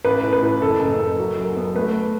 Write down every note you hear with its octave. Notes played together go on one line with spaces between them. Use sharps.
A1 B4
A2
B4
A2
F#1 A4
F#1
F#1
F#3
F#2
B3
A3 B4